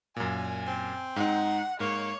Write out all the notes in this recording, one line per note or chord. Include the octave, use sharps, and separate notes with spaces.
F#2 A#2 G#5
C4
G#2 D#4 F#5
G#2 A#3 C#5